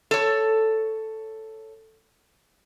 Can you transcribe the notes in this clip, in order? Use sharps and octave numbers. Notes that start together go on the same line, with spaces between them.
A4 C#5